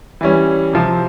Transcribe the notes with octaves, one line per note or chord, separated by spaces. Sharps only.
E3 G3 C#4
C3 F3 C4